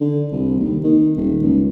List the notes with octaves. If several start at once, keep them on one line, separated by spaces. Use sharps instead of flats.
D3
C2
D#2
D#3
D#1
C#2